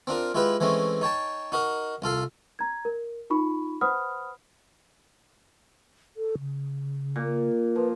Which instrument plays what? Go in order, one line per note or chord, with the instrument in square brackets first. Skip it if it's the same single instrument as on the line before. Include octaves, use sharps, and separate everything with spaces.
[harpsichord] C4 D4 F4 A#4
G#3 E4 F4 G4 B4
E3 G#3 A3 C4 C#4
D#4 C#5 G5 A5
D#4 F#4 A#4 D#5
C2 F4 A4 F5
[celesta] A#5 G#6
A#4
D#4 F4 B5 C#6
B4 C5 F#5 B5 D#6 F6
[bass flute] A4
C#3
[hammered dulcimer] A#2
[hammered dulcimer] F3 [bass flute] B4